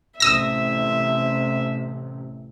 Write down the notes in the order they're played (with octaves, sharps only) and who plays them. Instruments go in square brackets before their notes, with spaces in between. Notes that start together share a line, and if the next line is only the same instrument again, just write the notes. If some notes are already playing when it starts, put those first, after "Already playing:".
[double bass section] A1 C3 [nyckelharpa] E5 [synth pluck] D#6 E6 A#6